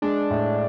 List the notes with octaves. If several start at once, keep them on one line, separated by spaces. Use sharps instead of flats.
G#3 D4
A2